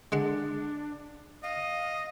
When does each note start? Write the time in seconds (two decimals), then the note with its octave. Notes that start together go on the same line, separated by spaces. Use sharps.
0.12 D3 G#3 D4 F#5
1.43 D#5 F5